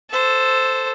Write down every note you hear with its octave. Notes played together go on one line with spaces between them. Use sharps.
A4 C5